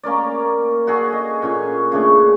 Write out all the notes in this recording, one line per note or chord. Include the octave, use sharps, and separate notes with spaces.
A#3 C#4 A#4 D5
F#4 G#4 A4
D#5
A#2 C#4 G#5
C#3 A3 D4 G#4